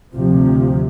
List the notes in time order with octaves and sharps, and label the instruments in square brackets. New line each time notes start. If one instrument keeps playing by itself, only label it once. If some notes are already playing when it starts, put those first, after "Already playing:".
[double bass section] D2 C3 F3